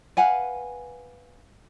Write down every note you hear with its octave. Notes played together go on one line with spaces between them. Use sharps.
B4 F5 F#5 G#5